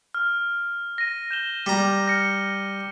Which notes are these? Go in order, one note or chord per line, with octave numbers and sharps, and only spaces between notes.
F6
A#6 D#7
G6 E7 G7
G3 A#5
F6 A#6 C#7